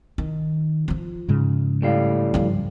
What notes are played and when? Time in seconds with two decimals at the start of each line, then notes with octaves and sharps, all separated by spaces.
0.18 D#3
0.88 F3 F4
1.28 G#2 C#3 G#3
1.82 A2 G3 F5
2.34 G2 F3